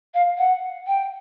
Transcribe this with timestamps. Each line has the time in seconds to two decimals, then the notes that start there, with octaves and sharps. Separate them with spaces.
0.14 F5
0.38 F#5
0.87 G5